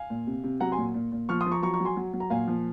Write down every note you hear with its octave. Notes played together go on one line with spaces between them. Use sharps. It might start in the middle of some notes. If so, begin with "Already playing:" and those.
Already playing: F5 G#5
A#2
C3
C3
F#3 F#5 A#5
G#5 C6
A#2
A#2
A#2
F3 C#6 F6
C6 D#6
F3
A#5 C#6
F#3 A#5 C#6
A#5 C#6
F#3
G#5 C6
F#3
F#3
A#5
A#2 F5 G#5
F3